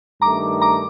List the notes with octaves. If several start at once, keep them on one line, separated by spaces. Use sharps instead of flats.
G2 D#3 A3 A#5 D6
A#5 D6